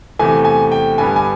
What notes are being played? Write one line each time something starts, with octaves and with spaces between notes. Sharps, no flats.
E2 C3 E3 A3 G#5
G#5
G5
G2 D3 G3 B3 G#5
G#5